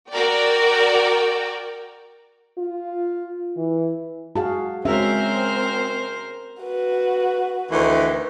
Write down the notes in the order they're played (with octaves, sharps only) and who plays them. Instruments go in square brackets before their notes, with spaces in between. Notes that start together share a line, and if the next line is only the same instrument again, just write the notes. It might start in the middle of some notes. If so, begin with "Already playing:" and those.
[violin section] F#4 A#4 D5 G5
[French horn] F4
E3
[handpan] F#4 G#4 F5 [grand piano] A5
[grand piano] G#3 F#4 [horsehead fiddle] C4 [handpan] C#4 E5 [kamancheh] A#4 C5
[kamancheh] F#4 B4
[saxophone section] D2 D#3 E3